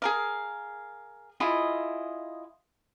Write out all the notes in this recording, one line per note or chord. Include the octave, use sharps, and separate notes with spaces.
G#4 A#4 F5
E4 F4 G#4 D#5